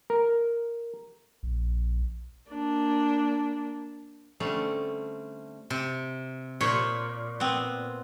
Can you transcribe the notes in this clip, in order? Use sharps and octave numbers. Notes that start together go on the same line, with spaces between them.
A#4
A#1
A#3 D4
D3 G3 A3 C4 C#4
C3
A#2 C5 C#5
B3 C4